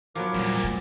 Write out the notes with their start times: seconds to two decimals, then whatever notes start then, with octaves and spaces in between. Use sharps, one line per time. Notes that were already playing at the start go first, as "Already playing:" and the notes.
0.15 F3 F#3 B3 A#4 D6
0.34 E2 A#2 G3
0.64 A3